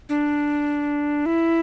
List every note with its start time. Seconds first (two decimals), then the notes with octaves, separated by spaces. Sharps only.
0.09 D4
1.26 E4